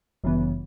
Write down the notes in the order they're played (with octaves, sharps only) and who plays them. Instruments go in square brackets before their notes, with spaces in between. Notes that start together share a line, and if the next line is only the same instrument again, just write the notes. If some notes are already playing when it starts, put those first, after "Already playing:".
[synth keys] G1 F#2 C#3 E3 B3